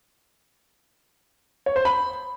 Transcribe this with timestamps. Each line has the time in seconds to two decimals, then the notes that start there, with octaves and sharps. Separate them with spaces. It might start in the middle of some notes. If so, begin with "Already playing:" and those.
1.66 C#5
1.76 C5
1.85 B5